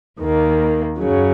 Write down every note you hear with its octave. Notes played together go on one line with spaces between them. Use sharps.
D#2 D#3 A#3
F#2 C#3 F#3